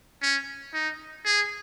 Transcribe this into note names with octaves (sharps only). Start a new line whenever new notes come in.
C#4
D#4
G#4